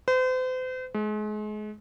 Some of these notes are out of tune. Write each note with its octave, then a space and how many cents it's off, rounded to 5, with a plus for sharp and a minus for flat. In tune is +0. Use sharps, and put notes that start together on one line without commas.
C5 -40
G#3 +35